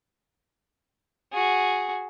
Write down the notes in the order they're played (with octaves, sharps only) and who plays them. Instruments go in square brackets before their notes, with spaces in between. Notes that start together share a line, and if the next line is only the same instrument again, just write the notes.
[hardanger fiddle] F#4 G#4